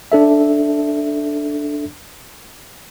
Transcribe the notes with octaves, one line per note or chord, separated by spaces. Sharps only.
D4 A4 E5